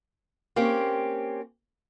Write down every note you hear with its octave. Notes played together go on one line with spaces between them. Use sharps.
A#3 C4 C#4 G4